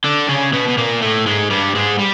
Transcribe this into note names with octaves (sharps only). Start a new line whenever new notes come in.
D3 D4
C#3 C#4
B2 B3
B3
A#2 A#3
A2 A3
G#2 G#3
G2 G3
G#2 G#3
G3